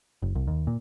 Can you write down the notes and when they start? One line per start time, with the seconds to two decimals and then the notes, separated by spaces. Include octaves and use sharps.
0.22 F#1
0.35 C2
0.47 D#2
0.67 A#2